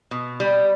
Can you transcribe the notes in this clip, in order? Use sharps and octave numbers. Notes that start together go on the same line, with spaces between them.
B2
G3